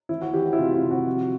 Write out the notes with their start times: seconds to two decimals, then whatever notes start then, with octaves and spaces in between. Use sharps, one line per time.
0.09 E3 E4
0.22 F#4
0.34 E3 G4
0.46 F#4
0.53 E4
0.58 C3 F4
0.75 F4
0.83 C3
0.91 F#4
1.07 F3